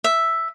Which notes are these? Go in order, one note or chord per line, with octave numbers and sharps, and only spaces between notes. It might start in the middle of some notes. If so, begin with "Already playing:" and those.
E5